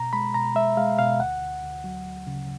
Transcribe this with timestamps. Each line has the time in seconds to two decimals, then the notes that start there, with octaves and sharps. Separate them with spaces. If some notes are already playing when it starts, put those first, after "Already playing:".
Already playing: B2 A#5
0.13 G#3 B5
0.34 B2 A#5
0.55 G#3 E5
0.77 G#3 F5
0.98 B2 F5
1.20 D2 F#5
1.41 D2
1.63 D2
1.84 F#3
2.06 D2
2.27 C#3